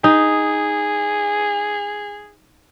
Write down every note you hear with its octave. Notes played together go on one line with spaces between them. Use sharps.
D#4 G#4